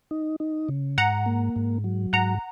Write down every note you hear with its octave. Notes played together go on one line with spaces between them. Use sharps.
D#4
D#4
C#3
G#2 F#5 A#5
A#3
G#2
F#3
G#2 F#5 A#5